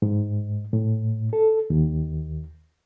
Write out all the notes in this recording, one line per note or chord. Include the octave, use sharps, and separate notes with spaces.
G#2
A2
A4
D#2